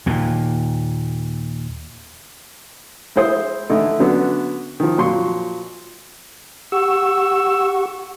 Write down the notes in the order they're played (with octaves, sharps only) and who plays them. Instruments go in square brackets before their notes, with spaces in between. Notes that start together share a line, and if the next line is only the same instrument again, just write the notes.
[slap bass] D#2 A#2
[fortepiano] G#3 E4 C5 D#6
D3 E3 A3 D#4 E4
D3 F#3 B3 C#4 D4
D#3 F3
F2 A#2 F#3 C6 C#6
[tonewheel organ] G4 F#5 C#6 [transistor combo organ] E6